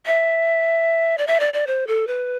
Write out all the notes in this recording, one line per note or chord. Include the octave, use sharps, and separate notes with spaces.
E5
D5
E5
D5
D5
C5
A4
B4